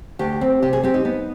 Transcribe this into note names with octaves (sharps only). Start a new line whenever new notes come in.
D2 G4
C4
C3 G4
G#4
C4 G4
D#4
B3